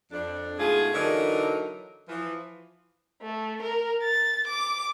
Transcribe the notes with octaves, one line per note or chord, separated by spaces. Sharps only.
F2 D4
G#2 B2 A3 F4 G#4
D3 E3 F#3 D4 D#4 A#4
E3 F3
A3
A#4
A6
D6